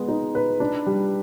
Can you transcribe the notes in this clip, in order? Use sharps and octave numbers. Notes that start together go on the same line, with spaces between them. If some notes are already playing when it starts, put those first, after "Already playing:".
Already playing: G#3 B3
D#4
B4
D4
G3